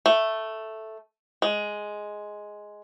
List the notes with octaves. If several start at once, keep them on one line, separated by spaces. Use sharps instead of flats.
A3
G#3